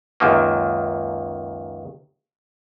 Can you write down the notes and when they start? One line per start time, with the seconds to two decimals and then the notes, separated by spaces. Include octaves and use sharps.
0.20 C#2 F#2 D#3 A#3